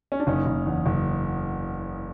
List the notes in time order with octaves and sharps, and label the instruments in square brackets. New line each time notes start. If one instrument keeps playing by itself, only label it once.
[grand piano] C#4
D4
F#1 C#4 D#4
F#1
E2
F#1